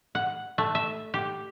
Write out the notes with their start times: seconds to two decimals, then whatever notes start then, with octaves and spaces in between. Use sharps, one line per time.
0.15 F#5
0.58 A3
0.75 E5
1.14 G4